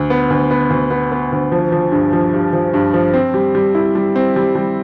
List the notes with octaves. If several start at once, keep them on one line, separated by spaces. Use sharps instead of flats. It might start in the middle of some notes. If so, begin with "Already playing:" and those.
Already playing: D2
B3
D2
B3
D2
B3
B3
D2
F3
F3
G2
F3
G2
F3
G2
F3
C4
G3
G3
E4
G3
C4
G3
G3